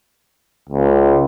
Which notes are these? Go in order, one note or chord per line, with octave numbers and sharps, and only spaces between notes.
C#2